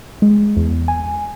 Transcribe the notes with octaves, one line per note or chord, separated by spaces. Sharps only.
G#3
E2
G#5